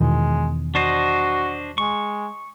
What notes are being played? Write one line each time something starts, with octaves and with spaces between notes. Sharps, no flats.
E2 B2 D#3 G#3
D4 F#4 C5 D#5
G#3 C#6